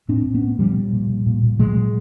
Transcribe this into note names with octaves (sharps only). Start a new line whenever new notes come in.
A2 C4 D4
A2
B3 C#4
A2
A#2 F3 G3
A#2
A#2
A#2
A#2
A#2
A#2 F#3 G#3
A#2